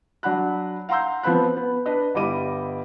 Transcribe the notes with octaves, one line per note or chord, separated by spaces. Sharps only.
F#3 D4 F#5 B5 F#6
F5 F#5 A#5 C6 E6 G6
F3 B3 C4 B5 F#6
B3
D4 B4 D#5
G1 G3 E4 D#5 D6 D#7